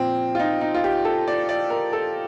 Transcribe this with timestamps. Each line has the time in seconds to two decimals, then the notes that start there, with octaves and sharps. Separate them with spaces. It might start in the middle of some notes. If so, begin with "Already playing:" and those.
Already playing: A#2 F3 C4
0.35 F4
0.39 D#4
0.61 D#4
0.74 F4
0.84 G4
1.05 A4
1.28 D5
1.49 D5
1.70 A#4
1.93 A4